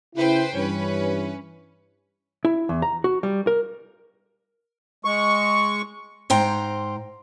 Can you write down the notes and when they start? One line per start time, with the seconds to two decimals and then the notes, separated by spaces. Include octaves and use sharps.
0.16 C#3 E4 B4 C5 G5
0.54 G2 E3 C#4 B4
2.45 E4
2.69 E2
2.82 A#5
3.04 F#4
3.23 G3
3.47 A#4
5.05 G#3 C#6
6.30 G#2 C5 G5 A#5